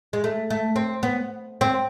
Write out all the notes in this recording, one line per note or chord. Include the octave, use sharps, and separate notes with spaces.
G#3
A3
A3
C4
B3
C4